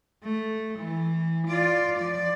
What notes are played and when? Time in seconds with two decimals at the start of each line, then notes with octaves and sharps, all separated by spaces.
0.23 A3
0.80 E3
1.49 F4 D5
1.98 F3 D5